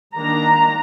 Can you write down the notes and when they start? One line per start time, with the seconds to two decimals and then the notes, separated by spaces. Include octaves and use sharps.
0.15 D#3 A#3 D4 A#5